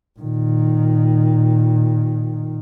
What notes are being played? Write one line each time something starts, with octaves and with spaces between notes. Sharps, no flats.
A#2 D#3